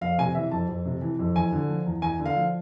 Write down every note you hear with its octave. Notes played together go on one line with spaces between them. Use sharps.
F2 F5
C3 G#5
E3 E5
F2 A5
F2
C3
E3
F2
E2 G#5
D3
F3
E2
E2 G#5
D3
F5
F3